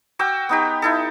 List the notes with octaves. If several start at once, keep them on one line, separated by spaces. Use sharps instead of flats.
F#4 G5 D6 E6
B3 D#4 G4
D#4 E4 A4